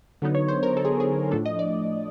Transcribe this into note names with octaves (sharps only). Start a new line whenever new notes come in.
D3 F#3 B3 D#4
C#5
C5
A#4
A4
G#4
G#4
A2 F3 A3 D4 A4
D#5
D5